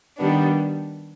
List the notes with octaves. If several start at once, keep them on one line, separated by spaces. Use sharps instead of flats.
D#3 G3 B3 D4